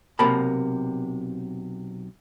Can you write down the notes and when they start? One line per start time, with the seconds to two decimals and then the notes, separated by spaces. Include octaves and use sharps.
0.19 B1 C3 A#3 A#4 A5 B5